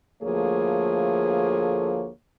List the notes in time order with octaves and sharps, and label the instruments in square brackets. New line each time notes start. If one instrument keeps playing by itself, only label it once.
[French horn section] D2 F3 A3 A#3 G#4 C#5